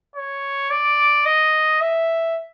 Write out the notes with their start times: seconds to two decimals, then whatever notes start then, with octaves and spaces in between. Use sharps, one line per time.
0.16 C#5
0.70 D5
1.26 D#5
1.81 E5